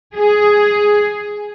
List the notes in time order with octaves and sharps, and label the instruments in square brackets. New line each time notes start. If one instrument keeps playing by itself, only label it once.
[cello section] G#4